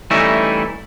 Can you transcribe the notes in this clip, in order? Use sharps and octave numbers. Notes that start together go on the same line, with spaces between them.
E3 G3 A3 C#4 D#4 E4